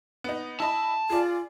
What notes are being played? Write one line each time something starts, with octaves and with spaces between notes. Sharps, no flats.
B3 D#4
E4 D#5 A5 B5
F4 G#4 D5